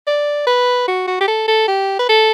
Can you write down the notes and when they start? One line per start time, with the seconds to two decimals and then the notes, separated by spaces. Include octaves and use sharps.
0.07 D5
0.47 B4
0.88 F#4
1.07 F#4
1.20 G4
1.28 A4
1.48 A4
1.68 G4
1.99 B4
2.09 A4